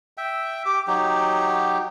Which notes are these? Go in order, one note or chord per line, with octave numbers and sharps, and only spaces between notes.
E5 G5
G4 D6
F#3 D#4 G4